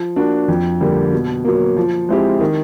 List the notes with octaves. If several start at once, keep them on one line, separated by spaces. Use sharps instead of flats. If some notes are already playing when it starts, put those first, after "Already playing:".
Already playing: F3
A#3 D4 F#4
F2
D3 G3 A#3
B2
F#3 A#3
F3
G#3 C4 E4 G4
D#3